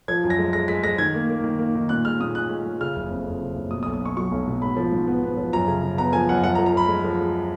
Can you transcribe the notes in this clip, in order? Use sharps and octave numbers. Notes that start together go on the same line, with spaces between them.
F3 G#6
F#2
A#6
G#3
G#3 A#6
G#3 B6
G#3 A#6
D#3 G#6
A#3
A#3
D#3
A#3
D#3
A#2 F#6
G#3 F6
A#2 D#6
C#4 F#6
G#3
G#3
C#3 F6
F#1
F2
F2
C#3
F#1
B2 D#6
D#6
B1
D#6
C#4 C#6
F#3 C#6
B1
B2
G#2 B5
F3
G#2
B3
B3
F3
F#2 A#5
C#3
C#3
B3 A#5
F3 G#5
F#2 F#5
F3 F#5
A#5
F3
A#5
F3 B5
G#3
F3
G#3